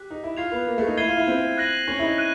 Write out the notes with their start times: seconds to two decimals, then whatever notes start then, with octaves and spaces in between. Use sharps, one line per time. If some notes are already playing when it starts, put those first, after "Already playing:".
Already playing: G4 F#6 B6
0.11 D#4
0.24 E4
0.37 F4 G#6 C7 F7
0.52 B3
0.67 A#3
0.78 A3
0.87 D#4
0.97 E4 G#6 C7 D#7 G7
1.08 F4
1.17 E4
1.28 C4
1.58 F#6 A#6 D#7 F#7
1.88 C#4
1.99 E4
2.02 D#4
2.18 F#6 A#6 D#7